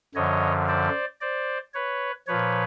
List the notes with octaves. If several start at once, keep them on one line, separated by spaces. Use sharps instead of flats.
F#2 D3 F3 C#5 D#5
C5 D5
C5 D5
B4 C#5
A#2 F3 B4 C#5